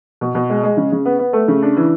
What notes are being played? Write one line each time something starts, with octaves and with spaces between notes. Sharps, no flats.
B2
B2
G#3
G#3
C#3
C#3
B3
B3
A3
C#3
D4
E3